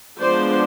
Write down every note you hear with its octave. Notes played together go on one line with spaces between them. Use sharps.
F3 G#3 B3 D4 C5 D5